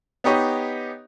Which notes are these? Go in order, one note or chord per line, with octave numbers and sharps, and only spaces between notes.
B3 D#4 G4 C#5 D#5